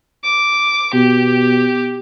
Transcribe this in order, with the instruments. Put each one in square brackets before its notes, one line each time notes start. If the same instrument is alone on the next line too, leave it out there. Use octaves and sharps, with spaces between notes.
[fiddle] D6
[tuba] B2 [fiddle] G4